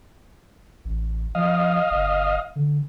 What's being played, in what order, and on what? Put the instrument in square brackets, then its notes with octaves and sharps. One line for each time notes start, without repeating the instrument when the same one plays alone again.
[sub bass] A1
[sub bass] F3 [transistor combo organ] D#5 F5
[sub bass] G1
D3